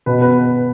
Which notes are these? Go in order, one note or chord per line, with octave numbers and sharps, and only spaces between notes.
B2 B4
B3 B4